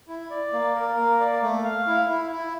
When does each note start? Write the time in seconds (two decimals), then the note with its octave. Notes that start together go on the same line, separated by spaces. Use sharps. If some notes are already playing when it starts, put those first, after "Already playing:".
0.08 E4
0.30 D5
0.53 A#3
0.75 A#4
0.97 A#3
1.20 D5
1.42 A3
1.64 F5
1.87 E4
2.09 E4
2.32 E4